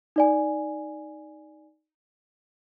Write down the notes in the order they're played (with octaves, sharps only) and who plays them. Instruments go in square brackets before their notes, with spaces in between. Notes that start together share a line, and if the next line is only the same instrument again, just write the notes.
[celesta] D#4 D5 G#5